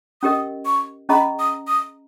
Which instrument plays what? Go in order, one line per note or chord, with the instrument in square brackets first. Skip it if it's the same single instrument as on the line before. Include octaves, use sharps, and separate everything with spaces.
[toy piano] C#4 G4 A#4 D#5 [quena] D#6
[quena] C#6
[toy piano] C#4 G#4 D#5 A#5 C#6 [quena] B5
[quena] D#6
D#6